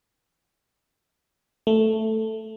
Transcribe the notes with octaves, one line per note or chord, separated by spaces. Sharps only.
A3